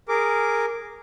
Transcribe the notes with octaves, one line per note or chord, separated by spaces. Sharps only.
G#4 A#4 D6